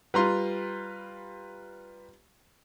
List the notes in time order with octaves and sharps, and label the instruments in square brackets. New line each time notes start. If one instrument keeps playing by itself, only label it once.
[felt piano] G3 F4 [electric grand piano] B4 A#5 C6